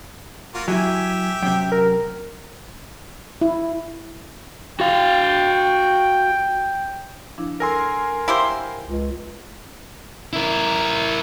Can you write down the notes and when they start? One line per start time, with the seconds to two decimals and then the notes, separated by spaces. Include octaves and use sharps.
0.54 A#3 F4 F#4
0.68 F#3 E4 G4 E5 G#5
1.42 F#2 C3 G5
1.72 A#4
3.41 E4
4.80 F#4 F5 G5
7.38 F3 D4 E4
7.60 A4 A#4 G#5 C6 E6 A#6
8.28 E4 G4 C5 E5 F5 A#5
8.86 C#2
10.33 E4 A#4